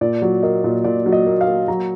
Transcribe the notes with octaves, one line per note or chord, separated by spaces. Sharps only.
A#2 D5
F#3
A#3 D#5
A#2
A#2 D5
F#3
D#5
A#3
F5
A#3
F#3 A#5